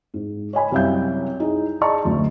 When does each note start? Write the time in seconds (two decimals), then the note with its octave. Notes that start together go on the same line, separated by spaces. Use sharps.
0.14 G#2
0.53 C#5 D#5 G#5 B5
0.72 C2 F#2 E5 F5 G6
1.40 D#4 E4 G#4
1.81 G#4 D5 D#5 A5 A#5 C#6
2.04 F#1 D2 A3